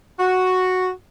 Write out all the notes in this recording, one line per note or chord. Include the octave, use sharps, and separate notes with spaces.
F#4